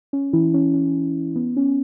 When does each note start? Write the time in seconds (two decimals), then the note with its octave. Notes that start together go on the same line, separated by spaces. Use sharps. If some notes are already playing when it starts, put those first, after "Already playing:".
0.13 C#4
0.33 E3 E4
0.54 C#4
0.74 C#4
1.36 B3
1.57 C#4